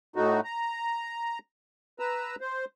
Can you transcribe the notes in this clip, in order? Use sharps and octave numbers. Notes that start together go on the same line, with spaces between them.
A2 A3 D#4 F#4
A#5
B4 A#5 E6
C5